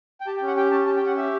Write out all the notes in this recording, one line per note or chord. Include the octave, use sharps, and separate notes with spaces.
G5
G4 A5
G5
C#4
F#5
G4 G5
C#4 A5
G4 A5
G5
C#4 F#5
G4 E5